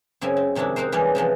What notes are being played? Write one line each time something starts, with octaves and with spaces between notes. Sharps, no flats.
F#2 C#3 C4 E4 G#5
C4
F2 C3 D#3 G#3 D4 E4
C4 D#4 F#4 A#4 C5
E3 G3 G#3 A#3 C#4 D#4
C3 E3 F3 B3